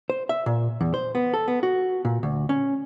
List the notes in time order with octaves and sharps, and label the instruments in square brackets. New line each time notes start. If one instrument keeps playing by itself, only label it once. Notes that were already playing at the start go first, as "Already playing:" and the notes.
[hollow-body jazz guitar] C5
E5
A#2
E2
C5
B3
A4
B3
F#4
A#2
D2
C#4